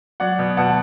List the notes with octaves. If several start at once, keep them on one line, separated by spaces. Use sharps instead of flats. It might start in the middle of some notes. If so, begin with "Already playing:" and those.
F#3 D5 F#5
B2
B2 F#5 A5